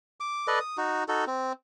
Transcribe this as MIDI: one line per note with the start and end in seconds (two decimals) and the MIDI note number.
0.20 0.47 86
0.47 0.59 69
0.47 0.59 71
0.47 0.59 74
0.47 0.59 75
0.60 0.77 87
0.77 1.04 63
0.77 1.04 66
1.08 1.25 63
1.08 1.25 66
1.08 1.25 69
1.27 1.52 60